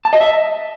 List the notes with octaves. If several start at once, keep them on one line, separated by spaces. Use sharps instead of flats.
A5
D#5
E5